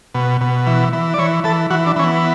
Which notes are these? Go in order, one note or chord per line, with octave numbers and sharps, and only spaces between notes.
B2
B2
E3
E3
D5
E3 C#5
E3 A4
E3 F#4
D4
E3 C#4
B3